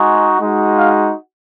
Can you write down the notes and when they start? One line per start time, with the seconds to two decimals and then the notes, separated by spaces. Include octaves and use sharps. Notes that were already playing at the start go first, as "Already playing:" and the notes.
Already playing: G#3 D#4 F#4
0.40 G#3 D#4 F#4
0.78 F5